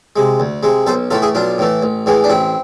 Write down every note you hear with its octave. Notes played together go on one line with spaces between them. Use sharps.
C3 G#3
D2
C3 G#3
B1 A4 C5
A2 E3 A3 F4 A4
E4 G#4
B1 D4 F4
A2 E3 A3
A1
A2 E3 G#3
D4
A1 C4 E4